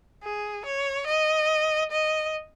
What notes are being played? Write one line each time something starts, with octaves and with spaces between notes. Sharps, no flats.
G#4
C#5
D#5
D#5